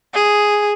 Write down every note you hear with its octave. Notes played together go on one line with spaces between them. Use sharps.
G#4